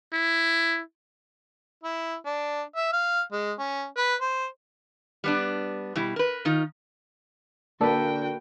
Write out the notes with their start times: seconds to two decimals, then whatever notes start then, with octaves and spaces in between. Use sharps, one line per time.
0.13 E4
1.83 E4
2.25 D4
2.76 E5
2.93 F5
3.32 G#3
3.58 C#4
3.97 B4
4.21 C5
5.24 G3 B3 D4
5.95 B2 G3 E4
6.16 A#4 B4
6.45 D#3 D#4 F4
7.81 D3 A#3 F#4 A4 B4 D5 G5